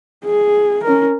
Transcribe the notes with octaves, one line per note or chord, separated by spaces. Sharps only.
G#4
C#4 A#4